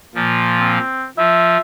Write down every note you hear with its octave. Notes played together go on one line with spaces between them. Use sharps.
A#2 F3
C4
F3 E5